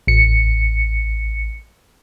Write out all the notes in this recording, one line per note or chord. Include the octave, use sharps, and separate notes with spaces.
A1 C#7